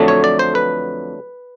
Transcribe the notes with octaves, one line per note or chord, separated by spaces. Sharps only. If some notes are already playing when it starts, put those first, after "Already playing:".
Already playing: F2 D3 F#3 A3
C#5
D5
C5
B4